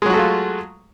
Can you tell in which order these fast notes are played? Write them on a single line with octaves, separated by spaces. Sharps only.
G#3 F#3 F#4 A3 F4